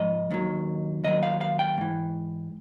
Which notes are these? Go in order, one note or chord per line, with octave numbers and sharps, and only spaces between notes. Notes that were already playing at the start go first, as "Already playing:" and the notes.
Already playing: G#2 F3 D#5
D#2 D#3 F#3
D#2 D#3 F#3 D#5
F5
F5
G5
G#2 E3